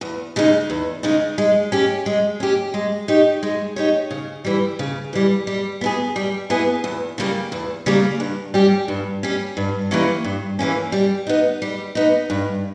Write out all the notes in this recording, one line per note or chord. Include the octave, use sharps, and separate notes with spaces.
E2
C#3 G#3 D#4
E2
C#3 G#3 D#4
G#3
C#4 G4
G#3
C#4 G4
G#3
D#4 G4 C#5
G#3
D#4 G4 C#5
C#3
E3 G3
C#3
E3 G3
G3
B3 E4 G#4
G3
B3 E4 G#4
E2
C#3 G3 A#3
E2
C#3 G3 A#3
G2
G3 C#4 G4
G2
G3 C#4 G4
G2
E3 G3 A#3 C#4
G2
E3 G3 A#3 C#4
G3
B3 D#4
G3
B3 D#4
G2